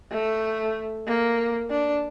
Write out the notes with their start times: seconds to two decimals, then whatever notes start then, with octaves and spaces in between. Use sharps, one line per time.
0.11 A3
1.07 A#3
1.70 D4